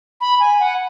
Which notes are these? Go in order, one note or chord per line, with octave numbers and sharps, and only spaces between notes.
B5
G#5
F#5